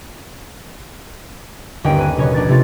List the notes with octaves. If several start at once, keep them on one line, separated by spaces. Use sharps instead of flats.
G1 D#2 C4 C#4 G5
B4 G#5
F#1 B2 C#4 C#5 C#6
A#1 D4 C#5 G#6 A6
C3 A3 F4 A6